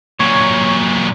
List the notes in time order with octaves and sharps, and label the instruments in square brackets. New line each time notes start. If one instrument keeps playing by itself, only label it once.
[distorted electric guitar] A#2 F#3 [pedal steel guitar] C#5